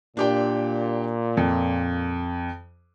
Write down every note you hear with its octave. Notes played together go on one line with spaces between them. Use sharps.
A#2 D4 G4 G5
F2